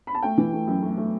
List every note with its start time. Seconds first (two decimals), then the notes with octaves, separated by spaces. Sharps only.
0.07 B5
0.15 A5
0.23 A3 G5
0.38 E3
0.53 A3
0.67 F#2
0.82 A3
0.98 A3